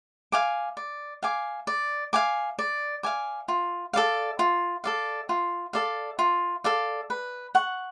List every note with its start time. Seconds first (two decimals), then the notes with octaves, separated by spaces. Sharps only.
0.32 F5 G#5 D6
0.77 D5
1.23 F5 G#5 D6
1.67 D5
2.13 F5 G#5 D6
2.59 D5
3.03 F5 G#5 D6
3.48 F4
3.93 A4 D5 F5
4.39 F4
4.84 A4 D5 F5
5.29 F4
5.73 A4 D5 F5
6.19 F4
6.64 A4 D5 F5
7.10 B4
7.55 F#5 C#6